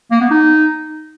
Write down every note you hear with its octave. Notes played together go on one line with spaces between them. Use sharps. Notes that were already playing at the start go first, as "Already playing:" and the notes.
A#3
B3
D#4